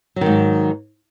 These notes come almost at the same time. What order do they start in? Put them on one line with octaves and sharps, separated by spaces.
F#3 D#3 G#2